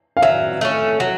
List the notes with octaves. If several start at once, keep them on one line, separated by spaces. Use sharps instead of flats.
F5
F#3 E5
A3 C#4
F#3